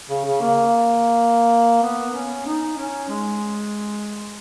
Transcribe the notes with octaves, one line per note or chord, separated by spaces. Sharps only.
C#3
C#3
A#3
B3
C#4
D#4
C#4
G#3